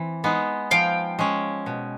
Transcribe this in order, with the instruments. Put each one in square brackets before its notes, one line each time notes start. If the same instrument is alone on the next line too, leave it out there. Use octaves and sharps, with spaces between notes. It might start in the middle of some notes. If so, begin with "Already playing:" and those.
Already playing: [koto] E3 C4
G#3 B3 D#4
[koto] F3 [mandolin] F5 G5
[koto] G#3 C#4
B2